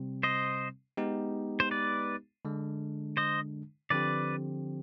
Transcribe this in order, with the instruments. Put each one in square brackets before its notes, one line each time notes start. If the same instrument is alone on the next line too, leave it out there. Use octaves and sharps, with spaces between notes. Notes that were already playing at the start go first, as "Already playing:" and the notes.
Already playing: [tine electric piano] C3 G3 C4
[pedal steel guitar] C5 D#5
[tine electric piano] G#3 B3 D#4 G4
[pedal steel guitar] C5
B4 D5
[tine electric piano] D3 G#3 D4
[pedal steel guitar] C5 D#5
[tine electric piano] D3 F3 C4 G4 [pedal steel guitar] B4 D5